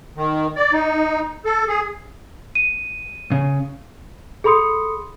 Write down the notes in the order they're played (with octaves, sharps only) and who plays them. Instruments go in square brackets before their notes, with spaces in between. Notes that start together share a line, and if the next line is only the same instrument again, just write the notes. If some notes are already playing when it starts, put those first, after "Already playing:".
[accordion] D#3
D5
D#4
A4
G#4
[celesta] D#7
[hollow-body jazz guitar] C#3
[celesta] G#4 A4 B5 C6 D#6 C#7